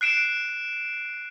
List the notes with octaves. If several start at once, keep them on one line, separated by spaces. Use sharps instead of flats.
F#6 C7 D7 E7